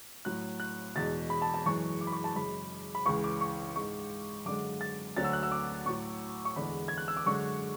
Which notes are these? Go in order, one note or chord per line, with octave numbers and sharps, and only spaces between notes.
A2 F#3 F#6
F#6
E2 B2 G#3 A6
B5
A5
A5
F#2 E3 G#3 C#6
D6
B5
C#6
A5
F#2 C#3 G#3 B5
B5
C#2 C#3 E3 C#6
D6
C#6
G#2 G#3 C#6
F#2 D3 G#3 D6
A6
D2 D3 F#3 A6
E6
F#6
E6
D6
A2 F#3 C#6
C#6
E2 D3 G#3 B5
G#6
F#6
E6
D6
F#2 D3 G#3 C#6